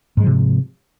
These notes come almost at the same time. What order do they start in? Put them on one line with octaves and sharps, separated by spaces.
G#2 G#3 F3 C3